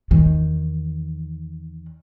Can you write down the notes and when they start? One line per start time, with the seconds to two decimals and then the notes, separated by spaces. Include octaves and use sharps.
0.11 E2 D#3